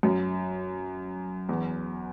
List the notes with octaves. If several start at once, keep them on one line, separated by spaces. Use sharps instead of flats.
F#2
E2